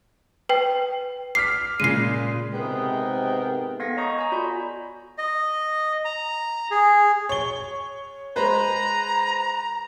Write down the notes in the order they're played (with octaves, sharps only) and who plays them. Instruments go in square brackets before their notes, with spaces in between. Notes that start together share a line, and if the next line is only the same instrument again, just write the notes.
[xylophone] B4 G5
[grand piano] D6 F6 B6 [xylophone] C7
[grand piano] A#2 C#3 G#3 [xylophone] C7 D#7
[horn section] G#2 C3 G#3 B3 A#4 G5
[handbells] B3 A4 F5 G#6 A#6 C#7
C#5 D#5 A#5 C#6 D#6 G6
G#5 A#5
F4 F#4 D5 B5 G6
[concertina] D#5
A#5
G#4
[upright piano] C#5 G7
[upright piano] G#3 B4 C5 [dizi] A#5